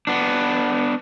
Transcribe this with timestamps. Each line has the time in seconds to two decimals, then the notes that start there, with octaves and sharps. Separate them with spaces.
0.07 B3 D4